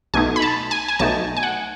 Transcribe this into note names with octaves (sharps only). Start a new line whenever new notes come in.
B1 B2 A3 D#4 G#5
B5
A5
G#5
G#5
B1 B2 A3 D#4 A5
G#5
F#5